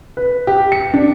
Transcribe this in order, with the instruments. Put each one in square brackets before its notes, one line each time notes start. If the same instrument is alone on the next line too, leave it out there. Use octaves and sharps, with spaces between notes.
[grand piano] B4
G4
C#7
D4